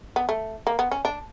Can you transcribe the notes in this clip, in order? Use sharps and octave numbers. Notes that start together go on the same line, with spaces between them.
B3
A3
A#3
B3
C#4
D4